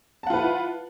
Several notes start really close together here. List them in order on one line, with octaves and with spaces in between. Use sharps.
A5 F#5 F4 B4 E4